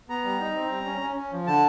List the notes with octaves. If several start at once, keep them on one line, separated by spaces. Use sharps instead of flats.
B3 A#5
G3
D#4
C4
G3
C#4
C#4
C#4
F3
D3 A5